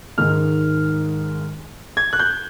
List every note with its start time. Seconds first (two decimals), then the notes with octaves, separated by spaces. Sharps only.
0.18 G#2 D#3 G#3 F6
1.97 G#6
2.13 F#6
2.19 G6